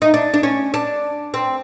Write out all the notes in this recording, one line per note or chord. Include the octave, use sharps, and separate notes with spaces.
D#4
D4
D4
C#4
D4
C4